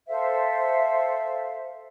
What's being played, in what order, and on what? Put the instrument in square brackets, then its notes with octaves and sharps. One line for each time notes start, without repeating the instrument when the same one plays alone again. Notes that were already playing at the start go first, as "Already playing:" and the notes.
[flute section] A4 C5 E5 F5